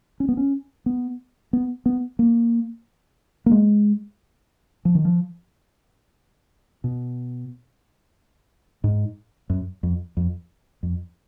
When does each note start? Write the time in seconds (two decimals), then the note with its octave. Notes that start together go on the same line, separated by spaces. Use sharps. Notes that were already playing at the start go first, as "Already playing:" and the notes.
0.20 C#4
0.29 B3
0.37 C#4
0.86 B3
1.53 B3
1.86 B3
2.19 A#3
3.46 A#3
3.52 G#3
4.85 F3
4.95 D#3
5.05 F3
6.84 B2
8.84 G#2
9.50 F#2
9.83 F2
10.17 F2
10.83 F2